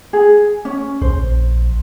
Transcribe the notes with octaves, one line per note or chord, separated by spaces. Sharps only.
G#4
C#4
A#1 C5